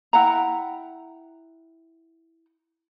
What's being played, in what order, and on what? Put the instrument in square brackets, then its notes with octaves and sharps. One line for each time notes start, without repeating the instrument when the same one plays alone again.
[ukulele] E4 F#5 G5 A#5